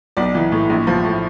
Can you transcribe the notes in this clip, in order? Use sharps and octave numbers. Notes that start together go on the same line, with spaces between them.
B1 D5
E3
A2
A#1
F3
A2